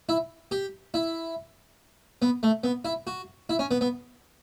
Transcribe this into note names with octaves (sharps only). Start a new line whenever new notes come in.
E4
G4
E4
B3
A3
B3
E4
F#4
E4
C#4
B3
B3